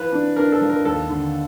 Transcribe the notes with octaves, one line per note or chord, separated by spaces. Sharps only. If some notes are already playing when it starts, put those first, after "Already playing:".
Already playing: E3 F3 B4
D4
D4 A#4
A4
F3
A#4
D#2 A4
D3